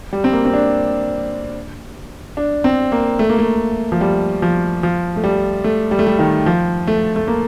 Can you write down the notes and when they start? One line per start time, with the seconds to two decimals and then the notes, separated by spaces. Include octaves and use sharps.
0.13 G3
0.24 C4
0.33 A#3
0.45 C4
0.54 D4
2.37 D4
2.64 C4
2.92 A#3
3.19 A3
3.29 A#3
3.38 A3
3.92 F3
4.01 G3
4.42 F3
4.83 F3
5.16 A3
5.24 G3
5.64 A3
5.91 G3
5.99 A3
6.07 G3
6.19 D#3
6.46 F3
6.87 A3
7.16 A3
7.28 A#3